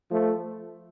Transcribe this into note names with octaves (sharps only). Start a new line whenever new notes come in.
F3 A3